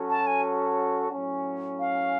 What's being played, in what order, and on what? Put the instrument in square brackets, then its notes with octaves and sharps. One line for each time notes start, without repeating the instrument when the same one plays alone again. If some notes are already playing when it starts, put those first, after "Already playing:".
Already playing: [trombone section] F#3 C#4 F#4 A4
[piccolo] A5
G#5
[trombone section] A2 F#3 C#4
[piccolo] F5